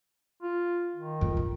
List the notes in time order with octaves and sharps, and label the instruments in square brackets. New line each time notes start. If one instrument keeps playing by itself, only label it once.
[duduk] F4
D#3
[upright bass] F2
A#1